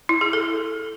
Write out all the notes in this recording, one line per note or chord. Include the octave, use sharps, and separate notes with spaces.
E4
G#4
A4